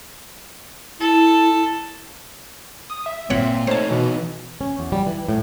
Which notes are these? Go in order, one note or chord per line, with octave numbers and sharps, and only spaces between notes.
E4 A4
D#6
E5
G1 A#2 C4 C#5 F#5
A3 D#4 C5 C#5 A5
B2 E3 B3 D#4
C#4
E2
G3
E3
A2